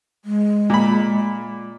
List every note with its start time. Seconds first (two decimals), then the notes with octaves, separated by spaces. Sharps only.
0.25 G#3
0.70 A#2 B5